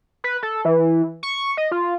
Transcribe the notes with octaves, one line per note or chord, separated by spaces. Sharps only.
B4
A4
E3
C#6
D#5
F4